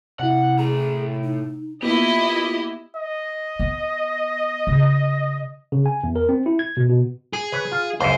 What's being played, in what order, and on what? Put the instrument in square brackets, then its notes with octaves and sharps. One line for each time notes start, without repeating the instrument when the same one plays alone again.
[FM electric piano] C3 E4 [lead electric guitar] F#5
[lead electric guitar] A2 A#5 [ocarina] G#4
[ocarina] D#4
[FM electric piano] A#3 B3 [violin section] E4 D#5 [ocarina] F4 [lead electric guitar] G4
[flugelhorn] D#5
[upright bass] B3
C#3
[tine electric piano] C#3
G#5
E2
A#4
C4
E4
G#6
B2
B2
[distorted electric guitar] G#4
[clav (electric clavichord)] B4 C#5
F4
[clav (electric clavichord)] C#2 F#2 [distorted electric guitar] C5